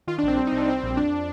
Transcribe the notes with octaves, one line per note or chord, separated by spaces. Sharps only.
D#3 F4
D4
A#1 C4
G3
D#4
C2 D4
G3 C4
A#1
F2 D4